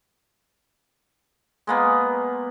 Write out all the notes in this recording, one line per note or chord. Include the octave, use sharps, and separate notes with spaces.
G#3 A#3 B3